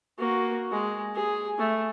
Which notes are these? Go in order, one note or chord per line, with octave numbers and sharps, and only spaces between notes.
A#3 F#4
G#3
G#4
A3